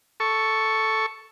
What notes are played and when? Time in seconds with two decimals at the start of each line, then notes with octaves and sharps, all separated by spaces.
0.20 A4 C#6